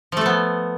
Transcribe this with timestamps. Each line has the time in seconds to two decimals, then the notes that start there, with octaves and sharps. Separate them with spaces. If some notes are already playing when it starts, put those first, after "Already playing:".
0.12 F3
0.17 A3
0.21 A4
0.26 B3